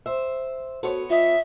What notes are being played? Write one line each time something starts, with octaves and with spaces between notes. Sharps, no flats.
C5 E5
B3 F#4 A4 C5 C#5
F4 D#5 E5